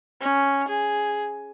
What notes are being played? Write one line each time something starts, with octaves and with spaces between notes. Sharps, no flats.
C#4
G#4